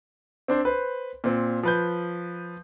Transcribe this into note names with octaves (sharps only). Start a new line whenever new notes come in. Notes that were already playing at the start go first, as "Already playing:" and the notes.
C4 D4 C5
B4 C5
A#2 C4
F3 B4 G6